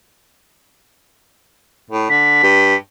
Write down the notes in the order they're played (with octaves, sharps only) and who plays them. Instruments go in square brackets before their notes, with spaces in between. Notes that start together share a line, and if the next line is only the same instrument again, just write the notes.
[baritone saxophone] A2
[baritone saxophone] D3 [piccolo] B6
[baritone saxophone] G2